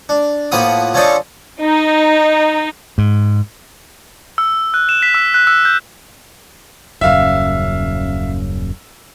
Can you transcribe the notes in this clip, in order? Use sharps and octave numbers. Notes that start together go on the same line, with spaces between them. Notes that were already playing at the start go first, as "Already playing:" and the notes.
D4
A2 F3 A#3 B3 B5 D#6
F3 C#4 D4 A4 C5 D#5
D#4
G#2
E6
F#6
E7
B6
E6
F#6
E6
G6
D#1 F#2 C#3 E5 F5